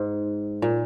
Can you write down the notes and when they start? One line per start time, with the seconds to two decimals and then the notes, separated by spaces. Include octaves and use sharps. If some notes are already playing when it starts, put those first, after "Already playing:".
Already playing: G#2
0.62 A#2